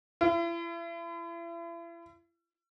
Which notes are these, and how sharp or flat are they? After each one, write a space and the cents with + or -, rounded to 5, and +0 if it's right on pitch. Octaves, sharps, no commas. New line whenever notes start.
E4 +40